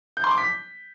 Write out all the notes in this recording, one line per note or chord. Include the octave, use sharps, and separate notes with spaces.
G6
C6
D6
B6